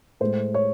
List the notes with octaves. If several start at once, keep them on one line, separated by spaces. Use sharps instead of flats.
A2 G#3 C5
C#5